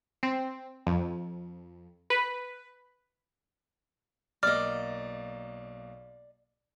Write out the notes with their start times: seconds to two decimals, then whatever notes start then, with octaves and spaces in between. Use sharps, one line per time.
0.23 C4
0.87 F2
2.10 B4
4.43 B1 A#3 D5 D#5 F6